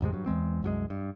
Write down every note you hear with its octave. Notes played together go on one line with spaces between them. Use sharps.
A1 F2 C3 G#3
G2 F#3
E2 E3 G#3 C4
C2 F#2 F#3 G#3
G2